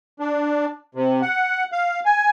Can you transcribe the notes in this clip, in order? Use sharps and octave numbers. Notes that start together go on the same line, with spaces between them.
D4
C3
F#5
F5
G#5